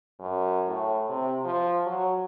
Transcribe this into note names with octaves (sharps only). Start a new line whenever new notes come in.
F#2
A2
C3
F3
F#3